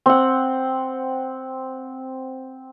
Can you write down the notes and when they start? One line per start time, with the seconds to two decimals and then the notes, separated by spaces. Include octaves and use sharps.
0.06 C4 F#5